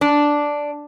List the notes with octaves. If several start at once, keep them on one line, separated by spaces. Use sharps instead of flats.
D4